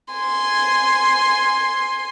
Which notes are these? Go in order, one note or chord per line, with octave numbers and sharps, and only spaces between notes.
G#5 C6